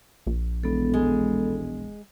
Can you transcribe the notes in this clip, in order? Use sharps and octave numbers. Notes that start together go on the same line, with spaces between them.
A#1
E1 B3 A4
G#3